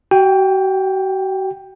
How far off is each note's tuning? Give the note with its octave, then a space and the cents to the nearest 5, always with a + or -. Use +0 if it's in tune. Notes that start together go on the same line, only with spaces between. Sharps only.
F#4 +40 G5 +10